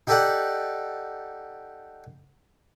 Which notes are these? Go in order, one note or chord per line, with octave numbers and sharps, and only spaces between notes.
D#4 G4 A4 D5 F#5